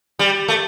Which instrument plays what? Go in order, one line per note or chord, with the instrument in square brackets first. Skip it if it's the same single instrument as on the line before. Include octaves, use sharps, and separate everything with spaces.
[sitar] G3
A3